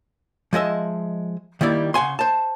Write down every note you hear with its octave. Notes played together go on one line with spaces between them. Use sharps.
F3 G#3 D#5 E5
D#3 G3 A#3 E4 D5
C#3 F#5 G#5 C6
C5 A5